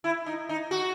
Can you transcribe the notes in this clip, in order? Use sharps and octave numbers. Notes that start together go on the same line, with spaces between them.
E4
D#4
D#4
F#4